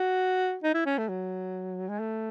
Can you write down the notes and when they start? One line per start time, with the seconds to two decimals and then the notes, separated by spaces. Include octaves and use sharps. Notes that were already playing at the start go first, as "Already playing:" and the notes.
Already playing: F#4
0.64 D#4
0.74 E4
0.86 C#4
0.98 A3
1.09 F#3
1.89 G#3
1.99 A3